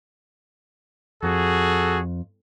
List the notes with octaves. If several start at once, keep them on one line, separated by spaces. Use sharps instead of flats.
F2 F#4 G#4 A4